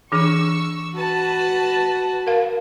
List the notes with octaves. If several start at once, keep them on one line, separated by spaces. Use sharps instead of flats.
E3 D4 G#4 C#6 E6
F#4 B4 A5
A#4 F5